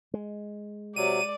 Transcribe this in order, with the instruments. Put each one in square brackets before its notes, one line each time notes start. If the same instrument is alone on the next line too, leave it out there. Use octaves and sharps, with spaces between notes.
[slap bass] G#3
[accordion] C3 F#3 [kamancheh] D5 [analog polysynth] D#7